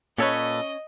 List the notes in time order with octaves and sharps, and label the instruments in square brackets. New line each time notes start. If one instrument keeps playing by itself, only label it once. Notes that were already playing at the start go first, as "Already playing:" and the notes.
[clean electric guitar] A#2 A4 B4 [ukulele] C#4 C#5 [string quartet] D#5